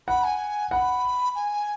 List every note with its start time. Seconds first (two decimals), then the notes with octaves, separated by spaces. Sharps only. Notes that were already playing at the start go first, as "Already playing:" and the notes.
0.08 F#5 B5
0.24 G#5
0.71 F#5 B5
1.35 G#5